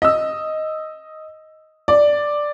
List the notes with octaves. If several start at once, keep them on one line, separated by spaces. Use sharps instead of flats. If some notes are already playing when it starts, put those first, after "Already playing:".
D#5 E6
D5